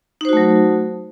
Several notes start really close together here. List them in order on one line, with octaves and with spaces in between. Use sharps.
D#4 C5 F#4 A3 F#3